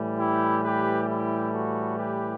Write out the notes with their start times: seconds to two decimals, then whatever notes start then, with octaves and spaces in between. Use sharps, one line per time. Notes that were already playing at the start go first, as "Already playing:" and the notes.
Already playing: A2 E3 G3
0.18 E4 G4
0.63 G4 B4
1.07 E4 G4
1.51 F#4 A4
1.97 G4 B4